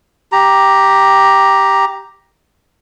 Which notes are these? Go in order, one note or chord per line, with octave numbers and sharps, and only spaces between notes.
G4 A#5